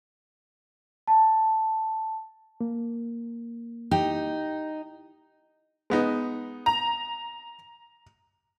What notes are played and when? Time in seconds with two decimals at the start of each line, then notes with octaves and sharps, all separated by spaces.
1.07 A5
2.61 A#3
3.91 D#4 G4
5.90 G#3 B3 D#4
6.66 A#5